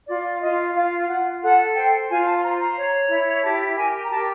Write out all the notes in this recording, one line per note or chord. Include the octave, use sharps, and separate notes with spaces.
F4 D5
F4 D#5
F4 F5
F4 F#5
A4 F#5
C5 G5
F4 G#5
A5
C5 A#5
A#5
C#5
E4
G4 A5
A#4 G#5
A#5
G4 A5